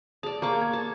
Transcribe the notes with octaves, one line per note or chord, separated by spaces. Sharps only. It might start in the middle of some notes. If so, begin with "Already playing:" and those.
G#4 D5 A5
A#3 C#6 D6
G#6
A5